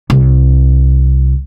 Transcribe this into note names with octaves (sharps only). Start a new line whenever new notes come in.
C2